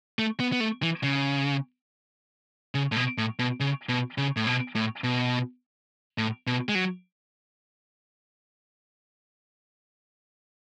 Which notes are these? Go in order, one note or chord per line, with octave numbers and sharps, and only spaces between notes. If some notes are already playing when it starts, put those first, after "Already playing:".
A3
B3
B3
A3
E3
C#3
C#3
A2
B2
A2
B2
C#3
B2
C#3
A2
B2
A2
B2
A2
B2
G#3
F#3